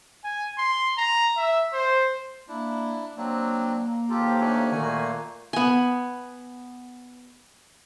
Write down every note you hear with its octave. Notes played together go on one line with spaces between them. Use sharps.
G#5
C6
A#5
E5
C5
A#3 D4 E4
F#3 A#3 C4 D4
D#2 G#2 F4 G4 A4
A3 C#4 D4
A#2 D#3 A3 A#3 F#4 G#5
B3 G#5